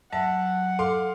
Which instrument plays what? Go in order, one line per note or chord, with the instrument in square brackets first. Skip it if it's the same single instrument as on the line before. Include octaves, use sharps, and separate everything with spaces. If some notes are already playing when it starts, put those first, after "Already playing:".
[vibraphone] F#3 [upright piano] E5 A5 [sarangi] F#5
[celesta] A4 [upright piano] F5 C6 D6